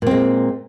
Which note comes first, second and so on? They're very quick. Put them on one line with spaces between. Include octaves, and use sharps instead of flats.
A#2 C4 G#3